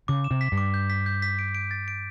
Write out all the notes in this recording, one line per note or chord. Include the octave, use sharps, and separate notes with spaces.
C#3 D6
E7
C3
B6
G2
D6
G6
B6
G6
B6
D7
D7
A6
D7